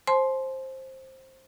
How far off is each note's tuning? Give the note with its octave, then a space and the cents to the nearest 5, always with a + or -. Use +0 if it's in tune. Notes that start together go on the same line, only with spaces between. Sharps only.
C5 +15 A5 -45 C6 +0